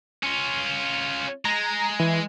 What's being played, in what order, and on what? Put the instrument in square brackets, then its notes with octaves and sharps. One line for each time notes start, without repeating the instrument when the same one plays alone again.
[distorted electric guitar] C#4 F4
[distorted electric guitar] G#3 [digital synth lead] A#5
[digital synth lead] E3